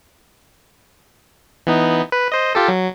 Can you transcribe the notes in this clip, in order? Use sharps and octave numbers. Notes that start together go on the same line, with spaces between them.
E3 B3 D#4
B4
C5 D#5
F4 G4 A4
F#3